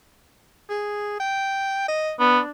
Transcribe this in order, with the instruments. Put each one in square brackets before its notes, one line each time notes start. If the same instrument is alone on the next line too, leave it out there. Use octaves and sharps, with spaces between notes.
[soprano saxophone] G#4
G5
D#5
[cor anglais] B3 [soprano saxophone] D4